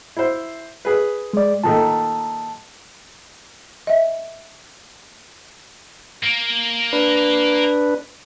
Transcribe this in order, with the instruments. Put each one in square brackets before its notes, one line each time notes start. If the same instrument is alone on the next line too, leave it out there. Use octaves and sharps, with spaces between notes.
[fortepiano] E4 C5
G#4 B4
[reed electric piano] G#3 D5
[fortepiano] A#2 D#3 A3 [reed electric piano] A5
[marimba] D#5 E5
[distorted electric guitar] A#3
[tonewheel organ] D4 B4